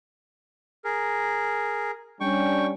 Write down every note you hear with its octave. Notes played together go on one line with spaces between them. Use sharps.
G#4 A#4
G3 C#4 D4 G5 C#6